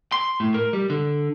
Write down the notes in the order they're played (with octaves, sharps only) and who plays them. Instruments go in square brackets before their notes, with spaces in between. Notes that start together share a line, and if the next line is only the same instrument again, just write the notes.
[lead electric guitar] C6
A2
A#4
G3
D3